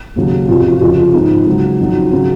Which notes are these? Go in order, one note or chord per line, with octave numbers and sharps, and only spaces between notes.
D#2 C#3 F#3
F2 C3 F3 F4
F#4
F4
F2 C#3 F3 F#4
F4
G#1 G#2 F3 D#4
C#2 C#3 F#3
F2 D#3 F#3
C#3 F#3 C#4